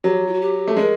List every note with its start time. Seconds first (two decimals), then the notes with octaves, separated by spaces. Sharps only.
0.04 F#3 G4
0.26 F4
0.33 F#4
0.41 G4
0.67 A3
0.77 G#3 A#4